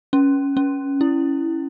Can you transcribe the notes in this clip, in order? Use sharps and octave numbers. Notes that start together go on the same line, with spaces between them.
C#4
C#4
E4